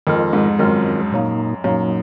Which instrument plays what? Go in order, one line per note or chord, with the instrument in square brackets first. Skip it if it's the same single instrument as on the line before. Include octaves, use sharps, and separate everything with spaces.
[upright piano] F2 [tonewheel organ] D#3 G#3 C4 F4 A#4
[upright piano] G#2
[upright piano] F#2 [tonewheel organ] D#3 G#3 C4 F4 A#4
[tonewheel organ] A#2 F#3 A#3 D#4
[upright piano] F#2 [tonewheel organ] A#2 F#3 A#3 D#4